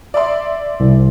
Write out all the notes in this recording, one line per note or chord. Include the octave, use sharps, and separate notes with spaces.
D5 E5 C6
C2